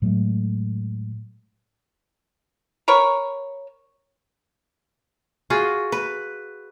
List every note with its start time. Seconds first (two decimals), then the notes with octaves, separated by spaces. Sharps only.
0.02 A2 F#3 G#3 A3
2.88 A#4 B4 C#5
5.50 F4 F#4 G#4
5.92 B4